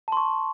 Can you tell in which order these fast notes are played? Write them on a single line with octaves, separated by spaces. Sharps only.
A5 C6 C#6